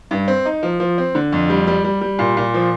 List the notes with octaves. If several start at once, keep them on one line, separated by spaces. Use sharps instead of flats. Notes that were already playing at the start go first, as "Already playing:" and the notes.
G2
C4
D#4
F3
F3
C4
D3
F2
G3
G3
G3
G3
A#2
A#2
F3